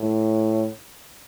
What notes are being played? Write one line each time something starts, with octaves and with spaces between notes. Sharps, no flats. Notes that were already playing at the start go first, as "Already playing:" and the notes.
Already playing: A2